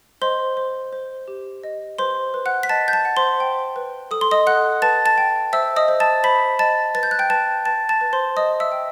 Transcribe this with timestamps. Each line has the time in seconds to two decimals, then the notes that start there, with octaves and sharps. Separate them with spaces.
0.22 C5 D#5 C6
0.57 C5
0.93 C5
1.28 G4
1.64 D#5
1.98 B4 C5 C6
2.34 B4
2.46 F#5 F#6
2.63 B6
2.69 D#5 A5 A6
2.88 G6
2.93 A5 A6
3.05 F#5
3.17 C5 C6
3.40 G5
3.76 B4
4.11 A4 D#6
4.21 C6
4.31 D#5 D#6
4.47 A4 F#5 F#6
4.82 B4 A5 A6
5.06 A5 A6
5.18 G5
5.53 C5 E5 E6
5.76 D#5 D#6
5.88 C5
6.00 A5 A6
6.24 C5 B5 B6
6.59 D#5 A5 A6
6.95 B4 A6
7.03 G6
7.11 F#6
7.19 G5 G6
7.30 B4 A5 A6
7.65 B4 A5 A6
7.89 A5 A6
8.01 B4
8.13 C5 C6
8.37 B4 D#5 D#6
8.60 E5 E6
8.72 G5